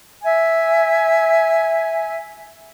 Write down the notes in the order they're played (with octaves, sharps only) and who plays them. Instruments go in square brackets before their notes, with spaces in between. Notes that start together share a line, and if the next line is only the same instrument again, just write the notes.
[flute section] E5 G#5